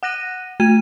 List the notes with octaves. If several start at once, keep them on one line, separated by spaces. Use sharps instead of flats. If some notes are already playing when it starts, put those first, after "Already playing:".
F#5 F#6 A#6 D#7
A3 G#6 D#7